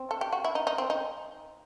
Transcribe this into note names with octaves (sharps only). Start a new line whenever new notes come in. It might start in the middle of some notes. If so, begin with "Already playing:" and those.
Already playing: C4
A4
G4
F#4
E4
D#4
D#4
C4
D#4